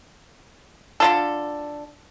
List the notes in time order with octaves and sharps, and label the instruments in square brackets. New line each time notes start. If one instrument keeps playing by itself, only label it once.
[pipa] D3 F4 A4